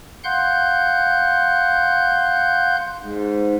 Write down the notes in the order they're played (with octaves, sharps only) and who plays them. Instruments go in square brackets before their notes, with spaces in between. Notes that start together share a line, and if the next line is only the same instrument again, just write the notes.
[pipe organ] F5 F#5 C6 F#6 G6
[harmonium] G#2